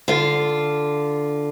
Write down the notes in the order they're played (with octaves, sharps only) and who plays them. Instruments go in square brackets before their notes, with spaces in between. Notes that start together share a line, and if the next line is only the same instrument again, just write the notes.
[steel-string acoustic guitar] D3 F4